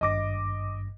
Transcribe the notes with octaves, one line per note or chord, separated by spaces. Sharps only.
G#1 G2 D#5 D6 A#6